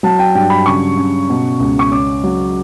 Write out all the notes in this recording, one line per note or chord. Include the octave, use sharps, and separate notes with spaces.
F#3 A5
G5
G2 G5
B5
C#3 C#6
C#3
B2
C#2
C#6
C#4 D6
F#3